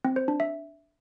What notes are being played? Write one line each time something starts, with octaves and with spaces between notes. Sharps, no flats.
C4
C5
D4
E5